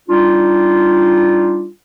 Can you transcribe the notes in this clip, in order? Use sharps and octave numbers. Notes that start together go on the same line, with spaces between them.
G3 D4 D#4 F4